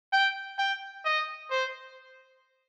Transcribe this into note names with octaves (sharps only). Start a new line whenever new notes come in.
G5
G5
D#5
C5